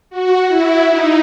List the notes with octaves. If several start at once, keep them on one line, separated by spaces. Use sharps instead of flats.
F#4
E4
D#4